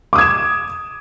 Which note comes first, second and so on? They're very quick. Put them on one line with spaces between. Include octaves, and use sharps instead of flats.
D6 D#6 G#6 E7